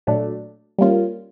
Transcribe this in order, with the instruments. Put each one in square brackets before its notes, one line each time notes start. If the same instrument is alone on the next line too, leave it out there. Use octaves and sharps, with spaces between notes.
[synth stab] A#2 F#3 A3 D4
G3 A#3 C#4 F4